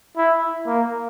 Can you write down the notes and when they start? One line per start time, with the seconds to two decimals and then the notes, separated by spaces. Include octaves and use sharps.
0.17 E4
0.67 A#3